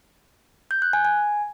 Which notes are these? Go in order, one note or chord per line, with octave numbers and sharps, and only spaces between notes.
G6
F#6
G#5
G#5